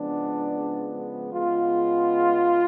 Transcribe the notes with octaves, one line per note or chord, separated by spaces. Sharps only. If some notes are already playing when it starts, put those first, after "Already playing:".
Already playing: C#3 F3 G#3 B3 D4
C#3 G#3 B3 F4